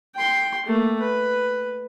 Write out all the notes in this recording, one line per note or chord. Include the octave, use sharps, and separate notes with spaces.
G5 C6
A3 A#3
B4